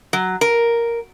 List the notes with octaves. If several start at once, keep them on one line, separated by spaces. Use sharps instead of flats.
F#3
A#4